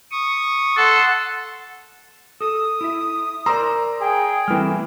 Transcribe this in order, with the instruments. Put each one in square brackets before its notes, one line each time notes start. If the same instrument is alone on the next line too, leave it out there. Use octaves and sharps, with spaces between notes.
[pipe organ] C#6 D#6
[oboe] A4 [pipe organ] F#5 C6
[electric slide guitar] A4 [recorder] D#6
[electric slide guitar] E4 E5
[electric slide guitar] A#4 C5 D5 [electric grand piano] A#5 C6 E6
[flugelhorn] G#4 [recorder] G5
[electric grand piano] E3 F6 [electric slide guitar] G3 A3 C4